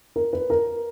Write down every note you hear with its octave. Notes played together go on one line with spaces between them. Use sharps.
A#4
B4
A#4